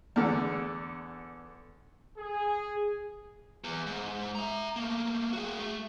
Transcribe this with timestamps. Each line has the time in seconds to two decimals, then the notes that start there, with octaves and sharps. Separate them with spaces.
0.16 E2 D3
2.17 G#4
3.64 E2
3.87 G#2
4.35 E5 A#5
4.76 A3 A#3
5.33 F#4 G#4
5.59 A3